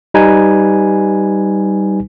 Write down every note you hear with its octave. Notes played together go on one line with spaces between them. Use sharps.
G3 D#4 B4 G#5